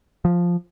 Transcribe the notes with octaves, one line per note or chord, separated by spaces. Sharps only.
F3